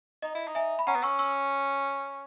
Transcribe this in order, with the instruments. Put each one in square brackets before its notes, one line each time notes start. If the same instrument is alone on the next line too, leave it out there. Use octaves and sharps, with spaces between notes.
[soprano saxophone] D#4 [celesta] D#5
[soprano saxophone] E4
D#4
[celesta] E5 G#5
B5
[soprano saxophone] C#4 [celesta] F#5 A#5
[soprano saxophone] B3
[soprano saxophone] C#4 [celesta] C#6 E6
[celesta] C#6 E6